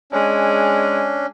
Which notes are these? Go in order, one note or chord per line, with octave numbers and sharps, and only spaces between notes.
G#3 C#4 D4